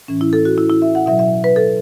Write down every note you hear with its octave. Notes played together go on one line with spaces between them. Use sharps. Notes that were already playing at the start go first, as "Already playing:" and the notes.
A2 E3 C#4
E4
A4
F#4
E4
E4
E5
F#5
B2 F#3 E5
E5
B4
A4